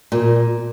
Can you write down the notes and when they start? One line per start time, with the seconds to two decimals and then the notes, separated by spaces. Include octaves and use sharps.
0.12 A#2